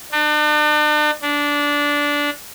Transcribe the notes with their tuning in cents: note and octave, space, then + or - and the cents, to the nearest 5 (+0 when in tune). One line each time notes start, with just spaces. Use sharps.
D4 +40
D4 -15